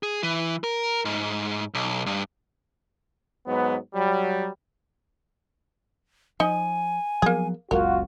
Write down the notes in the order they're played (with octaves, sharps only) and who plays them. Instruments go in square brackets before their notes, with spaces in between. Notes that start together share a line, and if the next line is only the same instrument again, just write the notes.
[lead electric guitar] G#4
E3
A#4
G#2
B1
G2
[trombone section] G#2 F#3 B3
F#3 G3
[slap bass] F3 [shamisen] D#4 D#5 [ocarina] G#5
[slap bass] F3 F#3 B3 [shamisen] A#3 G#4
[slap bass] F#1 C#2 F#2 [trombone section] F4 F#4 [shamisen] A#4